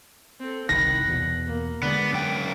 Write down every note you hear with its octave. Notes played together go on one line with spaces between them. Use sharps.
C4 A4
F#1 C2 D#3 F#5 B5 A#6
E2 B2
A#3
D3 G#3 B3 D5
F#2 G5